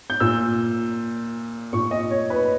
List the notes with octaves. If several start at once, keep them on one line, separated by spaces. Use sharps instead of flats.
G6
A#2 E6
A#2 C#6
D#5
C#5
B4